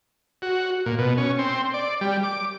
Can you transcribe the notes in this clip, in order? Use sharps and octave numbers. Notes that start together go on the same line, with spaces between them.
F#4
A#2
B2
C#4
C4
D5
G3
D6